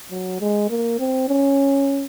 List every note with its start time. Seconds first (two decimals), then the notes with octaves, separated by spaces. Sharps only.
0.11 F#3
0.40 G#3
0.70 A#3
0.99 C4
1.28 C#4